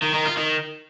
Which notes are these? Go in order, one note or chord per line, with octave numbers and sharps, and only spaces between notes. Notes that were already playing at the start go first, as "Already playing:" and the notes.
D#3
D#3
F4
D#3